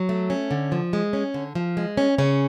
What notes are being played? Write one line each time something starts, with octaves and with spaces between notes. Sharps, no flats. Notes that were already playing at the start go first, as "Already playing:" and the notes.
Already playing: F#3
A3
C#4
D3
F3
G#3
C#4
D3
F3
G#3
C#4
C#3 C#4